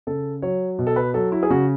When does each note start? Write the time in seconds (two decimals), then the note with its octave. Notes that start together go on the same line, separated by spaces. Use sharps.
0.07 C#3 A4
0.42 F#3 C#5
0.79 B2
0.87 A4
0.96 B4
1.14 F#3 A4
1.32 E4
1.43 G#4
1.50 C#3 F#4